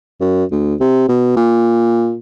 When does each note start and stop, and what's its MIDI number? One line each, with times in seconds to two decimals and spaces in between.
0.20 0.44 42
0.52 0.75 38
0.80 1.09 48
1.09 1.33 47
1.37 2.17 46